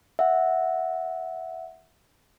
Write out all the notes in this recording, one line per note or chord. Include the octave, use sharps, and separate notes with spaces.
E5 F#5